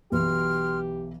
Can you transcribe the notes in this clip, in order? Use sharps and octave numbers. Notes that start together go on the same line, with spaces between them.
B1 E3 G4 B4 C6 F6